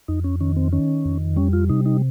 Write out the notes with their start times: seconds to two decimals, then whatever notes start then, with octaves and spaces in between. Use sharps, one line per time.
0.08 F2 D#4
0.24 C#4
0.40 D#3 C#4
0.56 C4
0.72 D#3 C#4
1.05 F2
1.36 G3 C#4
1.53 F4
1.69 C3 D#4
1.86 D#4